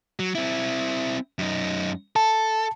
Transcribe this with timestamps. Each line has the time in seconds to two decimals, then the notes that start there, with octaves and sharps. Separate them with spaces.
0.19 F#3
0.35 C4 E4
1.39 F#2 D#4
2.16 A4 A5